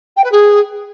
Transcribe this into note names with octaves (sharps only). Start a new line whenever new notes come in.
G5
B4
G#4